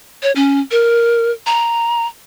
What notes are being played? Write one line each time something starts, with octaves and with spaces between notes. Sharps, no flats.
C#5
C#4
A#4
A#5